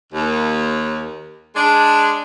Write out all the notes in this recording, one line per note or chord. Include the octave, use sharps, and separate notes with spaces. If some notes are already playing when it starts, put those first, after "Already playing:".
D#2
G#3 D4